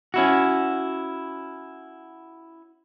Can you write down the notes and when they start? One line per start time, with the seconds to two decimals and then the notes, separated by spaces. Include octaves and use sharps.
0.14 C#4 E4 F#4